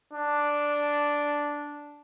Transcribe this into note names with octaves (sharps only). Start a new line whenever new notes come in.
D4